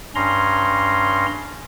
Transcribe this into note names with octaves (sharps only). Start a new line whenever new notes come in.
G2 C#4 A#5 C6